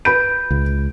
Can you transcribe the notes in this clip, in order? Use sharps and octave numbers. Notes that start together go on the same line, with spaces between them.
B4 B5 G6 D7
C#2